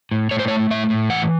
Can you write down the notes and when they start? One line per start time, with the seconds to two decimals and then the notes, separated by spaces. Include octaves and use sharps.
0.11 A2
0.31 A2 C#5
0.39 C5
0.48 C#5
0.51 A3
0.70 A2 E5
0.90 A2
1.10 E3 F#5